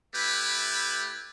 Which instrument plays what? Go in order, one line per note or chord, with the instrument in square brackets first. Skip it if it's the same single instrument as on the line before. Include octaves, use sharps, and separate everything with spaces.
[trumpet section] A3 E4 G4 B4